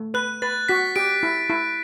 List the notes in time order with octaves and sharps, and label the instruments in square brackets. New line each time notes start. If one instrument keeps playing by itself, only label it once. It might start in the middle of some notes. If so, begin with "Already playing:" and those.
Already playing: [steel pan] A3
[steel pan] B4 [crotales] F#6
[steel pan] B4 [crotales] A6
[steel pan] F#4 [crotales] B6
[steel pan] G4 [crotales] D7
[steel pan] E4
E4